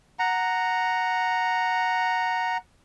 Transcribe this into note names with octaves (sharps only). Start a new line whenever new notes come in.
F#5 A#5